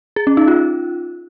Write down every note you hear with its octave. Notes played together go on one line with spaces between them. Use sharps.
G#4
C#4
D#4
F4